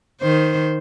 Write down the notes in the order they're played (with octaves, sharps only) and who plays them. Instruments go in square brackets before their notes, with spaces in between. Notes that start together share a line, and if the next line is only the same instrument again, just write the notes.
[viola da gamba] D#3 C5